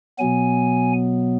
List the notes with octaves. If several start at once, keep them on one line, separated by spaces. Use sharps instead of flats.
B2 F#3 B3 G#5